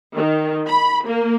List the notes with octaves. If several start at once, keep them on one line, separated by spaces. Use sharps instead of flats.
D#3
B5
A#3